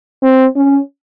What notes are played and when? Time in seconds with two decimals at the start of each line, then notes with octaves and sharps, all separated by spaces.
0.22 C4
0.56 C#4